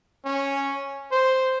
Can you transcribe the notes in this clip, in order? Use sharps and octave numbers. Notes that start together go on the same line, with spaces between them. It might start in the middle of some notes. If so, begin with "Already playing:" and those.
C#4
C5